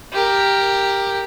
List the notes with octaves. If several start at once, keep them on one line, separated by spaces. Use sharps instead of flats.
G4 A#4